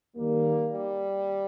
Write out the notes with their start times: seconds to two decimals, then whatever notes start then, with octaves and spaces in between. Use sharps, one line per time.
0.15 D#2 D#3 G3 A#3
0.71 G3